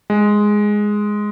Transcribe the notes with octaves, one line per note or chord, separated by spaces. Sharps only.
G#3